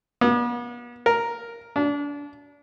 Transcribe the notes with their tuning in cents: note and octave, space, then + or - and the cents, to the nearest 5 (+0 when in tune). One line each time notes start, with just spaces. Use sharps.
B3 -40
A#4 +0
D4 -30